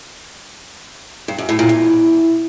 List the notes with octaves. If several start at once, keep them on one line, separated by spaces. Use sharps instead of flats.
G2
F#2
A2
A#2
E2